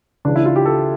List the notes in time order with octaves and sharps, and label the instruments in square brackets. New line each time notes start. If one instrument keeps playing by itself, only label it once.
[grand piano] C#2 C#3 E3 D4
E4
F4
G4
A4